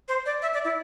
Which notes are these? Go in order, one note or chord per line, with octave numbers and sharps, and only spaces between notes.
C5
D5
E5
D5
E4